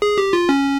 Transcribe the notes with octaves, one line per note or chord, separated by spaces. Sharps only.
G#4
G4
F4
C#4